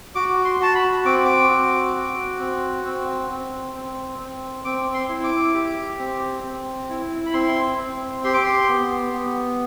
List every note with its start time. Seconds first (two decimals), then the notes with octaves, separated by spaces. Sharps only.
0.15 F#4 D6
0.45 C6
0.60 F#4 A5
0.75 B5
1.05 C4 D6
1.25 D6
1.50 F#4
1.95 F#4
2.40 C4
2.85 C4
3.30 C4
3.75 C4
4.19 C4
4.65 C4 D6
4.94 C6
5.09 E4
5.24 D6
5.54 G4
5.99 C4
6.44 C4
6.90 E4
7.26 B5
7.34 C4 C6
7.78 C4
8.24 G4 C6
8.34 D6
8.44 C6
8.69 B3
9.13 B3